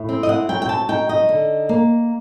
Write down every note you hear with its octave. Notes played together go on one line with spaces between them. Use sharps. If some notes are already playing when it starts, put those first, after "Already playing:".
Already playing: A2
C4
D#5
F#5
F#3 G5
G5
A5
D#4 G5
D#5
D3
A#3